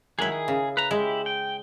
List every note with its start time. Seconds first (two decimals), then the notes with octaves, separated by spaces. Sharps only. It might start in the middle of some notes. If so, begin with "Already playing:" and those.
0.19 D#3 F#3 G#3 E4 G#4
0.32 G#4
0.48 C#3
0.77 B4 A#5
0.91 G#3 E4 G4
1.26 G5